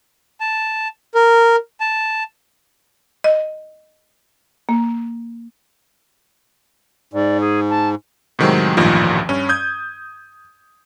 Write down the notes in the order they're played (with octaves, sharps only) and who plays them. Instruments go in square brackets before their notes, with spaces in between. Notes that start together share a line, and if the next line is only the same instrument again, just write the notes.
[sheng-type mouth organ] A5
A#4
A5
[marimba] D#5
A#3
[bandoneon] G#2 [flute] D5
[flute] G#4
A5
[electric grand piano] A2 C3 D#3 F#3 G#3 C4
A1 D2 G2 A#2 D#3 F3
G2 C#4
D#6 G6 G#6